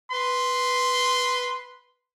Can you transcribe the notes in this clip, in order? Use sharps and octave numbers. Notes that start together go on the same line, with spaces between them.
B4 C6